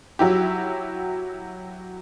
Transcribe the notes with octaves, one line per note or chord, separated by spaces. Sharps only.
F#3 E4 G4